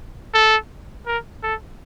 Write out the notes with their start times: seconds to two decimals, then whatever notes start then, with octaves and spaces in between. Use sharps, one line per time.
0.34 A4
1.07 A#4
1.43 A4